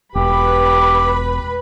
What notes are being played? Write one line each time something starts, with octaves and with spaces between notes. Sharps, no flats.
E1 G4 B4 B5